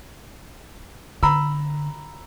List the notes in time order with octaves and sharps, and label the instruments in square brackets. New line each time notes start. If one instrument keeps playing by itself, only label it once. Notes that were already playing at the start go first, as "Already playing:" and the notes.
[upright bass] D3 [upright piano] A#5 B5 E6